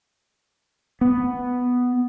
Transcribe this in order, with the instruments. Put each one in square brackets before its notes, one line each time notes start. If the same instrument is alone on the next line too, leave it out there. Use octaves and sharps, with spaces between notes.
[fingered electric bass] B3